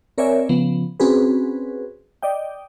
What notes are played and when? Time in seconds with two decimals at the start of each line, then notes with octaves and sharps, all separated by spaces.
0.18 C4 A#4 C#5 D5 E5 G#5
0.49 C#3 F3 B3
1.00 C4 C#4 F#4 G#4 B4
2.23 D5 D#5 G5